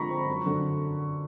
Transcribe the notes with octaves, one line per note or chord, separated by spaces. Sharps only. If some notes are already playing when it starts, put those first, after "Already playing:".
Already playing: D3 F3 G#3 C4 A#5 B5 C#6
C4
F#2
D3